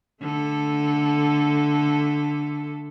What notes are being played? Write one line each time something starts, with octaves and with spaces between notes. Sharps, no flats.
D3 A3 A4